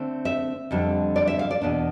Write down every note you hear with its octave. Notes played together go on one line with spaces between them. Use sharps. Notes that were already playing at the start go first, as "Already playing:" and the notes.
Already playing: D3 A3 C4
E5
F2 D3 G3 C4
D5
E5
F5
D5
E2 B2 B3 D4